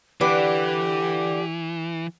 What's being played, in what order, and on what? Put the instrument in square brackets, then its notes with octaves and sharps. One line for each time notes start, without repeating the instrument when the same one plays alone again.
[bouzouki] D3 B4 D5 [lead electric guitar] E3 [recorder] G4